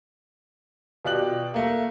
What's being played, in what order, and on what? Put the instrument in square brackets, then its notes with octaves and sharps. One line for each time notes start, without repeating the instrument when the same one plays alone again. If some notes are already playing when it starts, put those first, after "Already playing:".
[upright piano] B2 F4 G4 D5 F#6 F#7
A3 A#3